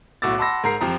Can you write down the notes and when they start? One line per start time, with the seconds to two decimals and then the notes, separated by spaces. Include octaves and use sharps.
0.22 B1 A2 F#4 D6 E6 A6
0.38 F#5 A5 B5 C6 E6 A#6
0.64 G#2 A#4 A#5 C7
0.81 F2 F3 G4 A#5